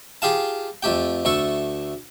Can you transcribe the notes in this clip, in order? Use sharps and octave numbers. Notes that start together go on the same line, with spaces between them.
F4 G4 G#4 F5 A5
F2 A3 G4 G5
D2 A3 A4 C#6